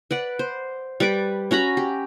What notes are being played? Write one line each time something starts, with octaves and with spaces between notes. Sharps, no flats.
B4 D5 F#5
C5
G3 B4 D5 D6
C#4 F#4 A#5 B5
G4